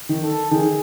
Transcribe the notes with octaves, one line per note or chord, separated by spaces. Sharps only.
D#3
A4
D#3 G#4